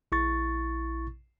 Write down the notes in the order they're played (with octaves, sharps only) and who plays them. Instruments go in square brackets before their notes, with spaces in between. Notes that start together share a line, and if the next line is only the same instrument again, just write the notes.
[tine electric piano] A#1 E4 C#6 A6